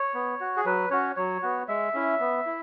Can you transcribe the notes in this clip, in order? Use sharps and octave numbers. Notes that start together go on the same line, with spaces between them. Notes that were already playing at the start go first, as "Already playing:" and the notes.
Already playing: C#5
B3
F#4
G#4
F#3 B4
C#4 F#4 C#5
F#3 C#5
B3 F#4
G#3 E5
C#4 E4
B3
E4